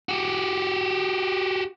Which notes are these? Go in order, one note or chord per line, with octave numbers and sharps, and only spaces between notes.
F#4 G4